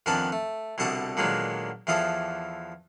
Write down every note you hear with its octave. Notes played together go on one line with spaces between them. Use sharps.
F2 D#3 B3 D4 G#5 A5
A3
C2 B2 D3 A5 C#6 D#6
A#2 D3 D#3 F#3 G#3 B3
E2 E3 F3 A4 D#6